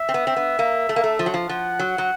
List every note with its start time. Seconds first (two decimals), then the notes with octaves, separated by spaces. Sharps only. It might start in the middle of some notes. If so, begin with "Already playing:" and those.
Already playing: E5
0.09 C4
0.14 B3
0.27 C4
0.36 B3
0.59 A#3
0.89 A3
0.96 A#3
1.04 A3
1.19 F3
1.26 F#3
1.34 F3
1.49 F3 F#5
1.80 F#3
1.98 F#3